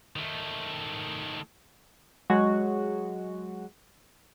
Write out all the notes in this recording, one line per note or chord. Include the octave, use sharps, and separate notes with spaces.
D#3 A3
F#3 G#3 F#4